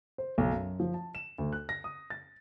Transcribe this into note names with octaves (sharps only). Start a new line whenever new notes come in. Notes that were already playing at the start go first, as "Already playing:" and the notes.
C5
B1
F#2
F3
A5
E7
D2
F#6
A#6
D#6
A6